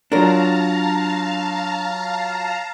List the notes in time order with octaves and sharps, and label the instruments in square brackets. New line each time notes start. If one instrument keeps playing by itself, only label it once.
[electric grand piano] F#3 F4 C#5 [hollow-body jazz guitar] D4 A#4 [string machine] F5 A5 A#5